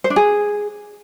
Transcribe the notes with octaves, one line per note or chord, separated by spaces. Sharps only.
C5
D4
G#4